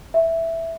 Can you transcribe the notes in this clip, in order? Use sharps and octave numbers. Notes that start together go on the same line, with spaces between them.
E5